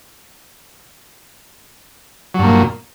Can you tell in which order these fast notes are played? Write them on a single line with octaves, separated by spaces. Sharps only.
F#3 G2 A#3 A#2